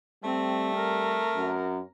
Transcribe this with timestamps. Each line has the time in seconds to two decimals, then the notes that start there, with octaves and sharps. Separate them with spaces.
0.24 G3 A3 C4
0.75 A#4
1.36 F#2